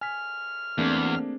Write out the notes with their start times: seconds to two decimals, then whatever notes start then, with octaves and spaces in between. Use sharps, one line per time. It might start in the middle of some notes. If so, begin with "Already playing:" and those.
0.01 G#5 F6 B6
0.78 E2 A3 A#3 C4 D4 G#4